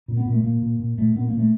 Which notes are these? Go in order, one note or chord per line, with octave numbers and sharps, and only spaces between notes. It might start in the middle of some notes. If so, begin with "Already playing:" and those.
A#2
B3
A#2
A3
A#2 A#3
A#2
A#2
A#2 A3
A#2 B3
A#2 A#3
A3